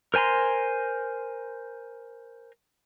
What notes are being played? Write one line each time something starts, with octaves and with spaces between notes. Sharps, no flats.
A#4 C5 G#5 A#5 C6